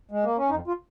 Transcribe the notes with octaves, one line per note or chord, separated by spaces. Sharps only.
G#3
A#3
C#4
F2 D#4
F4